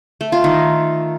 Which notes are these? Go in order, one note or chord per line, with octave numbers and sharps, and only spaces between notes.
A3
F4
D#3